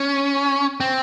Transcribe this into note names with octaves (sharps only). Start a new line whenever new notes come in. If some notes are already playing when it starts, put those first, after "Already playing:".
Already playing: C#4
C4